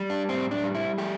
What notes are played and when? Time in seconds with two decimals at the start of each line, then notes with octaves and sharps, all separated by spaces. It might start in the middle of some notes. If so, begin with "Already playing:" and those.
Already playing: G3
0.10 D4
0.28 A2 C4
0.51 D4
0.64 G3
0.75 E4
0.98 A3 G4